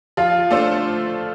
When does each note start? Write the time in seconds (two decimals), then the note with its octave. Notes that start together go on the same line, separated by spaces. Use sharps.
0.17 F3 F4
0.51 A3 D4 A4 C5